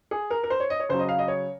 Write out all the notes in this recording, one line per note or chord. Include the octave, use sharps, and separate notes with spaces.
G#4
A#4
A#4
C5
C#5
D#5
C#5
C#3 F#3 C5
D#5
F5
D#5
C#5